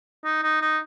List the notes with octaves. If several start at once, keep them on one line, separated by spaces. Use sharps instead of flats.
D#4
D#4
D#4